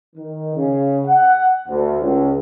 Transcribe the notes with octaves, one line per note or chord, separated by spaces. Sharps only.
D#3
C#3
F#5
D2
C#2